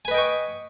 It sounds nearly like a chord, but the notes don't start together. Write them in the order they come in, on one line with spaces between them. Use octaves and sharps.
G#5 B4 D#5 G5 C#6